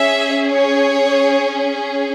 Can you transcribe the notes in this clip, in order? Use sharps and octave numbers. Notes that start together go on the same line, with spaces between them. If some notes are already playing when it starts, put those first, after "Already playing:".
Already playing: C#4 G#4 E5
C#5